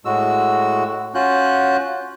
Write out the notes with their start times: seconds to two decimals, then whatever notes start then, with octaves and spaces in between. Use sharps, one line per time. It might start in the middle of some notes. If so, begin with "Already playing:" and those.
0.05 A2 G#3 F#4 E6
1.15 C#4 F4 F#4 F#6 G6